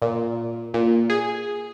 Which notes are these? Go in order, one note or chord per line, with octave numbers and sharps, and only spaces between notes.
A#2
A#2
G#4